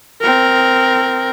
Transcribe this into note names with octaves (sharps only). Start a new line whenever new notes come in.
C4 A#4